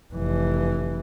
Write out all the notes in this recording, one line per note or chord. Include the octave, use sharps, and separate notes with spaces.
F1 E3